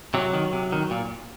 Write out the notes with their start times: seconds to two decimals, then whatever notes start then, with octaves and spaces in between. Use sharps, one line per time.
0.14 C3 F#3
0.34 D#3
0.53 C3
0.72 D#3
0.91 A#2